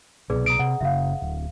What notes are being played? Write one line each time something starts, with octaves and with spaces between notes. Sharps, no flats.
C2 B2 G#4 B4 D5
A#5 D#6 D7
C3 F#5
F#1 C#3 E5 F5
D1